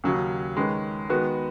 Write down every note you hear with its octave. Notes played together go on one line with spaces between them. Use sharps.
D#2 C#3 F#3 C#4
D#3 G#3 C#4 B4
D#3 G#3 B3 F#4 B4